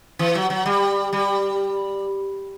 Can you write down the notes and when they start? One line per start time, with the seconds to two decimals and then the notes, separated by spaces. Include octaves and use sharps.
0.19 E3
0.35 F#3
0.50 F#3
0.66 G3
1.13 G3